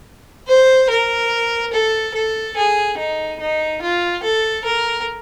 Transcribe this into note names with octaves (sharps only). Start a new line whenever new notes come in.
C5
A#4
A4
A4
G#4
D#4
D#4
F4
A4
A#4